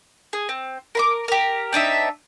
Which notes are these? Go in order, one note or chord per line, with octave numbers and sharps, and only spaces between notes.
G#4
C4
A#4 B5 D6
G4 A#4
C4 D4 D#4 E5